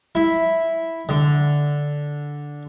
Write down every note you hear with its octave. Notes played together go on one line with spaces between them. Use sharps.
E4
D3